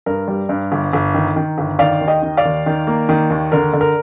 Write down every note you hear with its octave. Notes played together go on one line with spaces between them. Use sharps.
G2 A#4
G3
G2
G1
G1
D#3
D#3
G1
D#3 D5 F5
D#2
D#5 G5
D#3
D5 F5
D#2
D#3
A#3
D#3
D#2
D3 A#4
D3
A#4